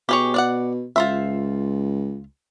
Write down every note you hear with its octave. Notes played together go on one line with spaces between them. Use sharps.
B2 G4 G#4 C#5
D4 D5 F#5
C#2 F4 C5 E5